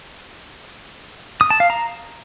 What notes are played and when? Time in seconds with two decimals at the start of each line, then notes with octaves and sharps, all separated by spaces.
1.41 D#6
1.50 A5
1.60 F5
1.70 A#5